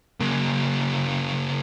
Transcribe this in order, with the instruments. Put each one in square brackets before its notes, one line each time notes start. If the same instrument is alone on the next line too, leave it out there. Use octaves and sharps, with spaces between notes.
[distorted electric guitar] C#3 A#3